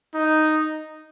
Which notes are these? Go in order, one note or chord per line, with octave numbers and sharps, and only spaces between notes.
D#4